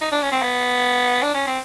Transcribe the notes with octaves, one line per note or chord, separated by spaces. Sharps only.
D#4
D4
C#4
C4
B3
D4
C#4
C4